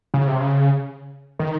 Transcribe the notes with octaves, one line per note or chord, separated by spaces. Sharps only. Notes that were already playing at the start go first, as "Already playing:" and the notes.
C#3
C3
C#3
D#3